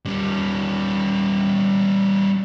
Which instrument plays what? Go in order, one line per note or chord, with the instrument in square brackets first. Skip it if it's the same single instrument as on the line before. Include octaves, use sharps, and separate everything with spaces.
[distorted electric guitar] G3 C#4